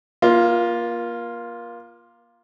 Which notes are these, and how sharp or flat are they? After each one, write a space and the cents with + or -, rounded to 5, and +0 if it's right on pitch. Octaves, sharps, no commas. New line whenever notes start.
A#3 +30 F4 +0